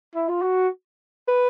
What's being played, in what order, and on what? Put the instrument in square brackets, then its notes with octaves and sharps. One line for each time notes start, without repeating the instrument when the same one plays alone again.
[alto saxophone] E4
F4
F#4
B4